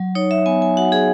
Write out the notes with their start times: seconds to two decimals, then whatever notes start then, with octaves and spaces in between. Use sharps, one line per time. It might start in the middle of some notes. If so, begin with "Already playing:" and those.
Already playing: F#3
0.15 D#4 C#5
0.31 E5
0.46 B3 G#5
0.62 G#5
0.77 F#4 F#5
0.92 G#4